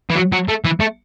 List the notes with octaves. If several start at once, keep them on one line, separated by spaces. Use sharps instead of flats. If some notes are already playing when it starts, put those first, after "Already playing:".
E3
F#3
F#3
A3
E3
A3